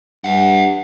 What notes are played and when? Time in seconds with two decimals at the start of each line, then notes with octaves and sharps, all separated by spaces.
0.24 G2 E5 F#5